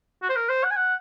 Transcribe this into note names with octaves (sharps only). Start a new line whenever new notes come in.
F#4
C5
A#4
C5
F#5
G#5
F#5